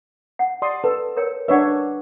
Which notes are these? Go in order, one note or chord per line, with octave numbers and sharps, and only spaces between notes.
F#5
D5 C6 D#6
A4 B4
A#4 C#5 G5
D4 B4 C#5 E5 F#5